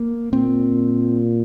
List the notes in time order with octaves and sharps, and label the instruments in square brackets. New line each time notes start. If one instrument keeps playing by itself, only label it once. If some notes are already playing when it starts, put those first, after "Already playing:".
Already playing: [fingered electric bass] A#3
[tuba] A#2 [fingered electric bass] C4